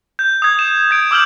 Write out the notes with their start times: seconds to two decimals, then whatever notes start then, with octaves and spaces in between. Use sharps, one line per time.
0.19 G6
0.42 D#6 G#6
0.59 E7
0.91 G#6 D7
1.11 D6 E6 F6 G6 F#7